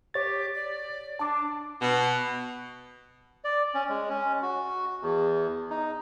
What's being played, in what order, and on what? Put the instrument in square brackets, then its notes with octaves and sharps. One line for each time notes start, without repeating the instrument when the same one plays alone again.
[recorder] G4 [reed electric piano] C#5 A6
[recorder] D5
[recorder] D4 [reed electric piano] A5 D6
[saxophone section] B2
[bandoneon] D5
C#4
G#3
C#4
F#4
E2
D#4